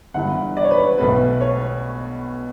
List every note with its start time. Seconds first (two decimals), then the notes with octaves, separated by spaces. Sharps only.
0.14 G1 G2 E3 F#5
0.57 D5
0.64 C#5
0.71 B4
0.78 C#5
0.98 B1 B2 A3 B4
1.41 C#5